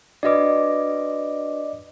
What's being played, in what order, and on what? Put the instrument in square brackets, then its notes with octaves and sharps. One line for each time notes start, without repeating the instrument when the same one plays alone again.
[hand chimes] D4 F#4 B4 [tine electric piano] D5 D#5 D6